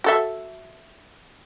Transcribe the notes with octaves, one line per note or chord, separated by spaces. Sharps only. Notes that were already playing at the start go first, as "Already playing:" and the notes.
F#4 A4 E5